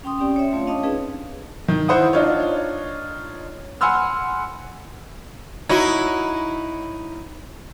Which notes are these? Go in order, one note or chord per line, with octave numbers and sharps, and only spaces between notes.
C#4 G5 C6 D#6
C4 C#4 G4 D5 G5
C#5 E5
A3 C4 F4 C#5 F5
C#4 D4 D#5 F5 A5 D#6
C4 D#4 G#4 B4
D#3
E4 C5 F#5 D#6
D4 D#4 F4 C#5
F#5 G#5 B5 C6 E6 F6
D#4 E4 F#4 C#5